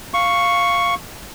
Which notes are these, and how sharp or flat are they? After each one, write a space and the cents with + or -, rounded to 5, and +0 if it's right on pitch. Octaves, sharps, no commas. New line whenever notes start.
F5 +0 C#6 +0